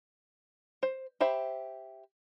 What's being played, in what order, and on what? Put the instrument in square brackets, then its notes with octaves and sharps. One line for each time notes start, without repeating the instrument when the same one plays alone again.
[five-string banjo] C5
G4 C5 E5 B5